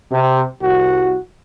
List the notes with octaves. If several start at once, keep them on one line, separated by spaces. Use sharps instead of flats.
C3
C2 F#4